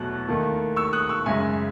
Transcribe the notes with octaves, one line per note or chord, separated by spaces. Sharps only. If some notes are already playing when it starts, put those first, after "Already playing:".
Already playing: E2 B2 F#3 A3 F#6
D#2 D#3 A3
C#6 E6
D#6 F#6
C#6 E6
F#2 C#3 G#3 E5 G#5